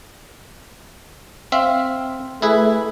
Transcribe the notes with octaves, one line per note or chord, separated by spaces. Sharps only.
C4 E5 F5
A3 E4 G#4 B4